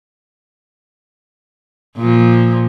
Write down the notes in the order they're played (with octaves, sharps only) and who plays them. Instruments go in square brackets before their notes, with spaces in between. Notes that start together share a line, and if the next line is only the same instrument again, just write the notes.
[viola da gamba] A#2 F3